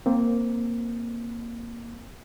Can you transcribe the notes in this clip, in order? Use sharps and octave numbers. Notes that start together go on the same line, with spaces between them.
A#3 C4